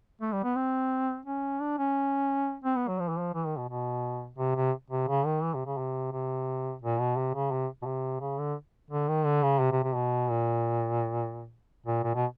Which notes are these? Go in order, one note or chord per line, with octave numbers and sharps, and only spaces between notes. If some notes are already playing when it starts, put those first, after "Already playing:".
A3
G3
B3
C4
C#4
D4
C#4
C4
B3
F#3
F3
E3
F3
E3
D#3
B2
B2
C3
C3
C3
C#3
D#3
E3
C3
C#3
C3
C3
A#2
B2
C3
C#3
C3
B2
C3
C#3
D3
D3
D#3
D3
C#3
C3
C3
C3
B2
A#2
A#2
A#2
B2